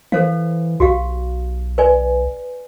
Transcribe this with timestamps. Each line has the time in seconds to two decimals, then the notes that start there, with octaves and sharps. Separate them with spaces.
0.12 E3 A4 C5 F5
0.80 B1 F#4 G4 F5
1.78 B4 D5 G#5